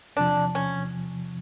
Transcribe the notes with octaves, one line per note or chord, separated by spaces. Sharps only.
E2 C3 F3 D4
C#4